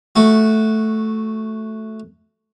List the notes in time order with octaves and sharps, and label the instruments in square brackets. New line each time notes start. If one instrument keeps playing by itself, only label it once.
[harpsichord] A3 F#4